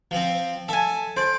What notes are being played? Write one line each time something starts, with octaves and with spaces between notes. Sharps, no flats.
F3 C4
A4 E5 G#5
C5 D5